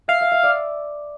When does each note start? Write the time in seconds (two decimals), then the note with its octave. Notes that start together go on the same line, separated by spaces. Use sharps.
0.08 E5 F5
0.21 E5
0.32 E5
0.43 D5